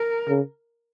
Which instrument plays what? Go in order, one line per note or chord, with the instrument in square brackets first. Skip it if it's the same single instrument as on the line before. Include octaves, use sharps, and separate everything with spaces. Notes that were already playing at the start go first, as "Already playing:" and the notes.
Already playing: [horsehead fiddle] A#4
[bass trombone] C#3